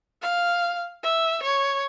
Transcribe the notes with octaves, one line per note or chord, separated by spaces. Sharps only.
F5
E5
C#5